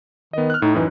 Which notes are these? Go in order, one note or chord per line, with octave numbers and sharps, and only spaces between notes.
D#3 B3 D#5
F6 F#6
A2 D#4
F#2 E3 D#4 E4